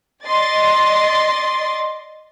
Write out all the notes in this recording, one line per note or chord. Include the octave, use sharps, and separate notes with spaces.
D5 D#5 C6 A6